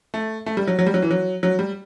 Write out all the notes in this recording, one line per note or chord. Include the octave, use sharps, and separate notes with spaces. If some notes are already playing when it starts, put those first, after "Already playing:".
A3
A3
G3
F#3
F#3
G3
F#3
E3
F#3
F#3
G3